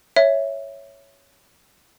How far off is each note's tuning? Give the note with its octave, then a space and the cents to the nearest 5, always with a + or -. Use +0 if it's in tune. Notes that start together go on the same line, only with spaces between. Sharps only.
C#5 +0 E5 +0